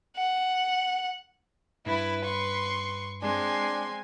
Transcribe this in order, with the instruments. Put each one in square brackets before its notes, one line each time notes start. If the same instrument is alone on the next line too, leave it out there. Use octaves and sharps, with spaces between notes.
[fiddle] F#5
[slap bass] G2 [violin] E4 B5 [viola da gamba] B4
[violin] C6 C#6
[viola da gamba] G#3 C4 [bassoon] D4 [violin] G#5 C6